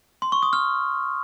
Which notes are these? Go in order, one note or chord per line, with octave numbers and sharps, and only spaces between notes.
C6
C#6
D#6
F6